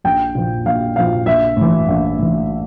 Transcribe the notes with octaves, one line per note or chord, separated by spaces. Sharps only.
A#1 G5
A#2 F3
A#1 F5
A#2 F3 F5
A#1 E5
A2 E3
A#1
A2 E3